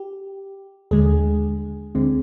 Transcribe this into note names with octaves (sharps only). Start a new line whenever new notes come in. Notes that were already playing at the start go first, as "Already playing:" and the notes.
Already playing: G4
D#2 D3 G#3 G#4
D2 D3 G#3 C4